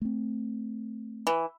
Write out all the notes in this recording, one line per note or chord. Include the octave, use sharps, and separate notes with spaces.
A3 C4
E3